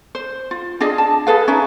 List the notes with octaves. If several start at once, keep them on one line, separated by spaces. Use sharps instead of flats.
C5
F4
D4 G#4 D#5 F5
A5
G#4 A4 B4 F5
C#4 D#4 B4 E5